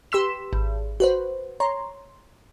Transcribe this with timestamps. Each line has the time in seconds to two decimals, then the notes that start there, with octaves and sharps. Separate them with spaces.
0.12 G4 B4 C6 E6 B6 E7
0.53 G#1
1.00 F#4 B4 C5
1.60 C#5 A#5 C6